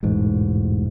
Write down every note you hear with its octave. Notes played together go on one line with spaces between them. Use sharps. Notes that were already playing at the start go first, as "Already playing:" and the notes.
E1 A1 G#2